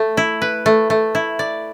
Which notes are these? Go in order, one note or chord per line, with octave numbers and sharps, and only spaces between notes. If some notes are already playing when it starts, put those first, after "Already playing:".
Already playing: A3
E4
B4
A3
A3
E4
D5